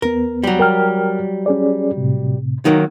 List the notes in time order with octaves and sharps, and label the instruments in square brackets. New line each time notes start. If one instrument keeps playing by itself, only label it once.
[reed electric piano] E2 B3 [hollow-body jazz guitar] A#4
[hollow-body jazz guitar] F#3 G3
[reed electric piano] A#4 G5 F6
C#4 G#4 D5
A2 C3
[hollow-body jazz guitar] D#3 F#3 A#3 [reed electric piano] D#4